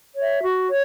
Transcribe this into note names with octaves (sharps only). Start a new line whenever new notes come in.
C#5 E5
F#4
C#5